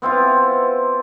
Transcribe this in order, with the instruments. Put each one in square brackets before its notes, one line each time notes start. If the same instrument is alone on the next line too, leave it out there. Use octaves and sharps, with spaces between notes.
[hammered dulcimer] B3 C4 E4 F4